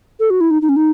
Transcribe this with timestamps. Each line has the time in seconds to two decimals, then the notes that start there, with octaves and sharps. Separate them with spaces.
0.20 A4
0.30 F#4
0.41 E4
0.51 D#4
0.62 D#4
0.69 C#4
0.76 D#4